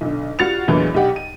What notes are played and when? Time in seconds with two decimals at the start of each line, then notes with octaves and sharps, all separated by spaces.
0.01 B1 D3
0.39 G3 F4 F#4 A6 C#7 F7
0.68 E2 A#2 D3 E3 F#3 G#3
0.94 B1 G3 G4 F#5
1.16 D#7